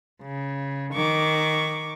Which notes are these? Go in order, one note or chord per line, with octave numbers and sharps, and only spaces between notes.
C#3
D#3 C#6 D6